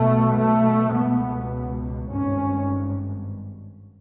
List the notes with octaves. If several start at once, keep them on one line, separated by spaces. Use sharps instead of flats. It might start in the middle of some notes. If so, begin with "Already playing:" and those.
Already playing: B1 B2 A3
A3
C#2 B2 B3
G#1 G2 C#4